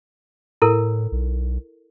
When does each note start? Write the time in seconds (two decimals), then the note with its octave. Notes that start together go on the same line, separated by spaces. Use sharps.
0.62 A2 E4 A4 A#4
1.12 B1